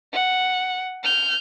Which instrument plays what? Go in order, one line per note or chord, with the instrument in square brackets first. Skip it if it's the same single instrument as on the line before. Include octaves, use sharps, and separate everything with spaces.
[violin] F#5
F6 G6